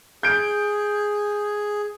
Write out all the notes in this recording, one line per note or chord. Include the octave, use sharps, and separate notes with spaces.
G#4 G6 D7